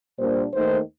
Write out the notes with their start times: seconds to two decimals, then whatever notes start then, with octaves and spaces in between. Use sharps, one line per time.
0.18 A#2 G3 A#3 D4 C5
0.53 D#2 D#3 A3 D#4 C5